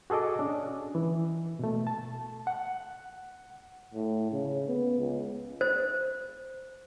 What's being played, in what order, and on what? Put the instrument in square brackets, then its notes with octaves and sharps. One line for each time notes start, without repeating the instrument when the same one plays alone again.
[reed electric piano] F#4 G#4 A4 D#5 D6
C#4 D4
E3
B2 A3
A5
F#5
[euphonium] A2
C#3
B3
C#2
[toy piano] C5